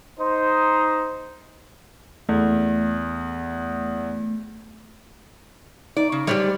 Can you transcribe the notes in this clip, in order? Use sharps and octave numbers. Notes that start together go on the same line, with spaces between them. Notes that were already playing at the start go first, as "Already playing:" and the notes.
D#4 C5
E2 A3
D#4 D5
C#3
G3 G#3 C4 G4 C#5 D5